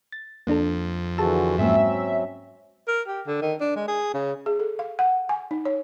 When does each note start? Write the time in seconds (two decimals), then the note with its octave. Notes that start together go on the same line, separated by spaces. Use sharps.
0.12 A6
0.47 F2 A#3 D4 A4
1.18 D3 E3 F#4 G#4 A5 E6
1.58 G#2 F#3 G#3 A#3 C4 C#4 E5
2.88 A#4
3.08 G4
3.26 D3
3.41 D#3
3.61 D4
3.76 G#3
3.88 G#4
4.14 C#3
4.46 G#4
4.60 A4
4.79 F5
4.99 F#5
5.29 G#5
5.51 D#4
5.65 C#5